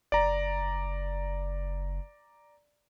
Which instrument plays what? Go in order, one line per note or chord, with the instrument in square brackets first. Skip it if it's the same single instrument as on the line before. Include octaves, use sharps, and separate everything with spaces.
[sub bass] F#1 [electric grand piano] D5 A#5